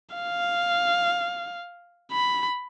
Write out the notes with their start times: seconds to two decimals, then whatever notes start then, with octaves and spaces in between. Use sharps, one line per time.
0.16 F5
2.12 B5